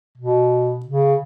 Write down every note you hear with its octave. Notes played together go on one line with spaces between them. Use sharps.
B2
C#3